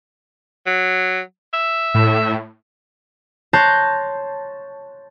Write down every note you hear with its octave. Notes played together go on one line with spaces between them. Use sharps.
F#3
E5
A2
C#5 A5 C6 F#6 G6 A#6